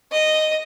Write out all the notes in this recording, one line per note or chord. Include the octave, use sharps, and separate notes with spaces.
D#5